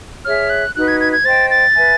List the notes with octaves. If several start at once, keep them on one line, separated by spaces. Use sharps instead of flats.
G#4 C#5 E5 F6
F#6
D#4 F#4 B4 F#6
G#6
G#6
G#6
C5 D#5 G5 A6
A6
B4 E5 G#5